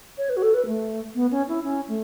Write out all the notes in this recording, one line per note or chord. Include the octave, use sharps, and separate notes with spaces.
C#5
B4
F#4
A4
B4
A3
B3
C#4
E4
C#4
A3